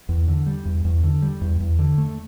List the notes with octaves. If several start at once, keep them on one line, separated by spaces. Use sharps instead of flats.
E2
D3
G3
E2
E2
D3
G3
E2
E2
D3
A3